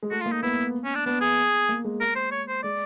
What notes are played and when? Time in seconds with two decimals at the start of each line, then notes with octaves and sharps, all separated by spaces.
0.03 G#3
0.11 A3 F#4
0.21 F4
0.26 A#3
0.31 D#4
0.43 B3 E4
0.84 C#4
0.95 D4
1.06 B3 D4
1.21 G#4
1.69 A#3
1.84 G#3
2.00 A#4
2.16 C5
2.31 C#5
2.48 C5
2.63 G#3 D5